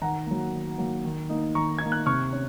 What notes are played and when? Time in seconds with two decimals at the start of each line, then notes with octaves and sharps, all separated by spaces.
0.01 D#3 F#5 A#5
0.27 F#3 A#3
0.52 D#3
0.78 F#3 A#3
1.04 D#3
1.29 A#3 D#4
1.55 D#3 A#5 C#6
1.78 D#4 G#6
1.86 A#3
1.92 F#6
2.06 C3 C#6 F6
2.32 C#4